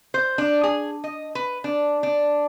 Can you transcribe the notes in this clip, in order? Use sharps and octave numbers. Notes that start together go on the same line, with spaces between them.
C5
D4
G#4
D#5
B4
D4
D4